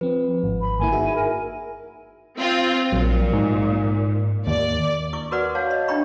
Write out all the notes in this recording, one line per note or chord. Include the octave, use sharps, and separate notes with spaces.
F3 C4 B4
G#1
B5
G1 A#3 E4 G#5
D#4 F#4 G#4 E5
A#4
C4 F4
A#1 A#2 F#3
G#2
D#2 D5
E4 C#6 D6
F#4 A#4 B4 D5 F#5 D6
C#5 F5 F#5 A5
C#5 D#5
D4 E4 G5 B5 C#6